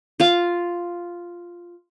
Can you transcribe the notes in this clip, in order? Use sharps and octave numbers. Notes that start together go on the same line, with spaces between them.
F4 F5